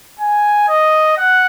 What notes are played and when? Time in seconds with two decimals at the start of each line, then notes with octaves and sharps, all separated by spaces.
0.19 G#5
0.68 D#5
1.18 F#5